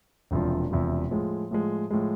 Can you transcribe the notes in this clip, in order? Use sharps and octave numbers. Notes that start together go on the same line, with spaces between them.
E1 E2 C3 F3
E1 E2 C3 F3
A2 F3 G#3
A2 F3 G#3
A2 F3 G#3